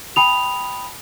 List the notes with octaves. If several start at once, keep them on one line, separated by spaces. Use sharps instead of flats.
G5 A5 B5 D#6 F7